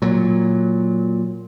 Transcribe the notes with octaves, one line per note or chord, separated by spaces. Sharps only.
A#2 F#3